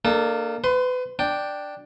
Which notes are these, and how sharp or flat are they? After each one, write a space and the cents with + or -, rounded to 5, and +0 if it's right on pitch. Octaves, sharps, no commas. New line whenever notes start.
A#3 -10 D4 +40 A4 -20
B4 +30 C6 +0
D4 +5 G5 +0